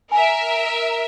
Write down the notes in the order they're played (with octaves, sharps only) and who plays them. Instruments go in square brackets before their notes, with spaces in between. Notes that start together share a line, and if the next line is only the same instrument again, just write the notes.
[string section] A#4 E5 [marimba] G#5